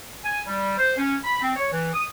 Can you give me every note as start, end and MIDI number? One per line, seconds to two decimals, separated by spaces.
0.24 0.41 80
0.47 0.75 55
0.77 0.94 72
0.98 1.16 61
1.24 1.37 83
1.40 1.52 60
1.56 1.71 73
1.72 1.90 52
1.93 2.05 87